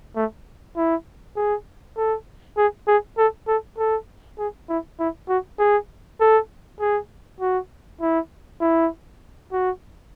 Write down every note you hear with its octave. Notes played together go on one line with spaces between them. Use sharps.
A3
E4
G#4
A4
G#4
G#4
A4
A4
A4
G#4
E4
E4
F#4
G#4
A4
G#4
F#4
E4
E4
F#4